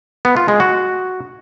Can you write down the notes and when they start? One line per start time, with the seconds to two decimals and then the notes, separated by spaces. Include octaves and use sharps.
0.25 B3
0.37 F4
0.48 G#3
0.60 F#4